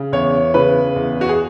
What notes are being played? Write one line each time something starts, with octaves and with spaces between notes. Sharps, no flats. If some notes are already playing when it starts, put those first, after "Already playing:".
Already playing: C#3
E2 C#5
C#3 B4
E2
F#4
G#4